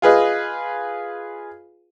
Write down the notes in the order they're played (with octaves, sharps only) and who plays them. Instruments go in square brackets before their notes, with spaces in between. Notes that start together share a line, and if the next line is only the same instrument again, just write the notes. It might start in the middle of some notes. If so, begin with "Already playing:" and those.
[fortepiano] F4 G#4 B4 D#5